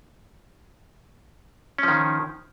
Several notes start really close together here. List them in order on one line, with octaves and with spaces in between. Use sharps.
C#4 F3 D#3